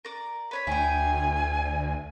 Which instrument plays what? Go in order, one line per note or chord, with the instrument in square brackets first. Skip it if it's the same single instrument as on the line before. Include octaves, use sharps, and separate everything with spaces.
[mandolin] A#4 D5
B4 C#5 B5
[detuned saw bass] D2 [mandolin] E4 G5 [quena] G#5